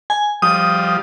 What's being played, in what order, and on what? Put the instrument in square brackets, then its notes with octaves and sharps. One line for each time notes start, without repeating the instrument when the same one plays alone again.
[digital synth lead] G#5
[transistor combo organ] F3 G3 [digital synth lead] D#6